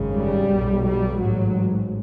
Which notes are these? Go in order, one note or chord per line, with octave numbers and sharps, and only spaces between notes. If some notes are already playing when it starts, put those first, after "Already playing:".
Already playing: G#1 F#2 C#3
G3
B1 B2
G3
A1 G#2 F#3